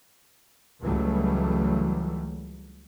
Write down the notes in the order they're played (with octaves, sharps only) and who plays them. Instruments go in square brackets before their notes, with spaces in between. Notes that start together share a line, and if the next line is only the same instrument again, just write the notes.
[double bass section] C#2 E3 F#3 G3 A3